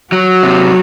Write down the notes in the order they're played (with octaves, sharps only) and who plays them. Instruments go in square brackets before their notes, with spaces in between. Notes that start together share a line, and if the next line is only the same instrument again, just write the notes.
[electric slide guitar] F#3 [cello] F#4
[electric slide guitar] C3